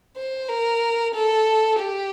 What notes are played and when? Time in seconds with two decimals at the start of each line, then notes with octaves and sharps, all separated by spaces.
0.16 C5
0.49 A#4
1.14 A4
1.79 G4